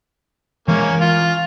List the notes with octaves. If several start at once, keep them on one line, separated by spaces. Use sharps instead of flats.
E3 G#3 A#3 C#4
F4